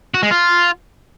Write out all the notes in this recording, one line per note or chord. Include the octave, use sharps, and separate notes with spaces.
F#4
G#3
F4